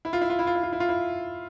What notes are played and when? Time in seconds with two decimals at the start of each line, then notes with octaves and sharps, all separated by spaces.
0.05 E4
0.13 F4
0.21 E4
0.30 F4
0.39 E4
0.47 F4
0.55 E4
0.63 F4
0.73 E4
0.80 F4
0.89 E4